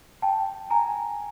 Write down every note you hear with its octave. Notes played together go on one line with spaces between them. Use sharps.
G5 A5
G#5 A#5